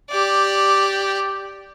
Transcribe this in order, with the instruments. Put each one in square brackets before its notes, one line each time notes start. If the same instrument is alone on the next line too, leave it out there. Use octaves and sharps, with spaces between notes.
[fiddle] G4 D5